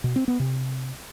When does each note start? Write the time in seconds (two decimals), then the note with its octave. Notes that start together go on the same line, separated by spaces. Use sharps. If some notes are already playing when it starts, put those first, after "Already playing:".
0.04 B2
0.16 C4
0.28 B3
0.40 C3